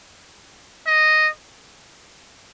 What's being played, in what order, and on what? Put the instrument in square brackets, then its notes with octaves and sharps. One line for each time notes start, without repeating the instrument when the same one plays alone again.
[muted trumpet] D#5